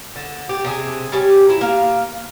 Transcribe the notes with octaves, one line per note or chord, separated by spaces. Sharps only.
D3
G4
C3 D4 G#4
G3 A3 C#4 G4
F#3 E4
A#3 F5